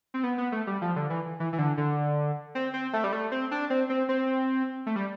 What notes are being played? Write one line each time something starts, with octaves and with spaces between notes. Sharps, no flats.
C4
B3
B3
A3
G3
F3
D3
E3
E3
E3
D3
D3
C4
C4
A3
G3
A3
C4
D4
C4
C4
C4
A3
G3